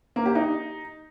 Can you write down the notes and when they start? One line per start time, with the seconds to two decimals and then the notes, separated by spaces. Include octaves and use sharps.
0.16 A#3
0.26 G4
0.35 D#4